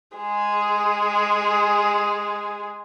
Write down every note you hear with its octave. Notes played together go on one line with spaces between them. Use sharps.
G#3 G#4